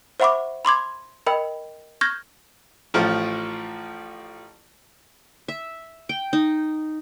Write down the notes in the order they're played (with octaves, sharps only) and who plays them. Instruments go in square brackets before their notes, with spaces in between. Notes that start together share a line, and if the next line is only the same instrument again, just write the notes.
[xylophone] C5 E5 F#5 B5 C#6 D6
B5 C6 D6 G#6
A#4 D#5 G5 B5
C#6 F6 G6 G#6 A#6
[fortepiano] A1 A2 F3 F4
[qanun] E5
G5
D#4